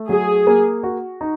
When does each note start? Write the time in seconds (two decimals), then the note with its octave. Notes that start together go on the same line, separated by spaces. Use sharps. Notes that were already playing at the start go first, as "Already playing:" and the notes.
Already playing: A3
0.09 F#3 G#4
0.47 A#3
0.83 F#4
1.21 D#4